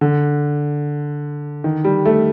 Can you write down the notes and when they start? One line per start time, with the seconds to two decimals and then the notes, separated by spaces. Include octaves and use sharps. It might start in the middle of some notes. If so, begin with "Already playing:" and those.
0.01 D3
1.64 D#3
1.84 G3
2.05 A3